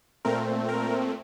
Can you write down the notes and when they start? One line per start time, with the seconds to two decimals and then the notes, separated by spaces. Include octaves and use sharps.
0.25 A#2 A3 C4 A#4
0.68 A#4